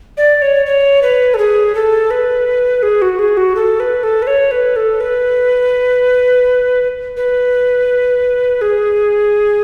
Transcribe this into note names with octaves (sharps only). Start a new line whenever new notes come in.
D5
C#5
C#5
B4
A4
G#4
A4
B4
G#4
F#4
G#4
F#4
A4
B4
A4
B4
C#5
B4
A4
B4
B4
G#4